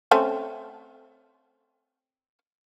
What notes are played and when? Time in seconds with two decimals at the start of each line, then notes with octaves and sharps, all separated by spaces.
0.11 A3 C4 C#4